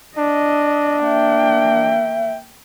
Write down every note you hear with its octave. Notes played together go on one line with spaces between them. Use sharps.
D4 D#5
A#3 E5 G5